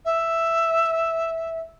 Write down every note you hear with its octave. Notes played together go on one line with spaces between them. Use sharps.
E5